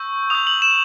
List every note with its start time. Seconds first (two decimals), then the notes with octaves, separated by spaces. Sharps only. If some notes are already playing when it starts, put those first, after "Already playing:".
Already playing: C#6 E6 G6
0.30 D#6 G6 F7
0.47 F#7
0.62 E7